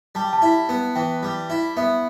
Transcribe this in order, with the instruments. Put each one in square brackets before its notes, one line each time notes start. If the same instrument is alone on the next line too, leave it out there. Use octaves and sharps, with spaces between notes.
[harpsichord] G3 [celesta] A5
[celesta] G5
A5
[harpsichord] E4
B3
[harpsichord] E3 [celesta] G5
[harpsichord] G3
E4
[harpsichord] B3 [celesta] E5